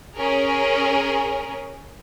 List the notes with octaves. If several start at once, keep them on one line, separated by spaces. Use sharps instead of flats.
C#4 G#4 A#4